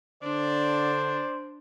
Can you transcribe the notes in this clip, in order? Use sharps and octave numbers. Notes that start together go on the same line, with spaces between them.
D3 D4 C5 D5